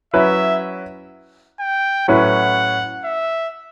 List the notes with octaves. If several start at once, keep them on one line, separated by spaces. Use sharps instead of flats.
F#3 C#4 E4 B4 E5
G5
A2 F#3 C#4 E4 B4 F#5
E5